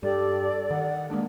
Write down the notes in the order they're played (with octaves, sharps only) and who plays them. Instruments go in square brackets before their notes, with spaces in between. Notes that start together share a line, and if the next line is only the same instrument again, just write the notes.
[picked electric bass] G2 [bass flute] G4 [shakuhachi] A4 [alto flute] D5
[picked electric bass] D#3 [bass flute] F#5
[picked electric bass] G#3 D4 [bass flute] A#3